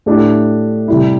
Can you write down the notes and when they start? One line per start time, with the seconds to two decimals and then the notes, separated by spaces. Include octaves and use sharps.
0.06 A2 A3 D4 G4
0.88 C3 G3 E4